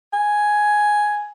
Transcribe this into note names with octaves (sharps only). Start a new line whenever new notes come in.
G#5